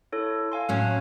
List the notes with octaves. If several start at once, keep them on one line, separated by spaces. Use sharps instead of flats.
E4 A4 C#5
F5 G#5 C6
A2 F#3 C#4